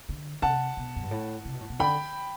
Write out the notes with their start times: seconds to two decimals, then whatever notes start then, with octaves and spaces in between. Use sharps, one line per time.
0.09 D3
0.42 C3 F#5 A5
0.77 B2
0.96 F#2
1.03 G2
1.11 A2
1.45 C3
1.54 B2
1.61 A2
1.70 B2
1.79 D3 G5 B5